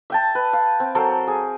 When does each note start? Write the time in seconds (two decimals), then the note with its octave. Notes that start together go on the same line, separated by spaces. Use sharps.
0.10 E5 G5 A5
0.35 B4
0.53 F5
0.80 C4
0.95 F#3 A4 A#4 C5
1.28 G#4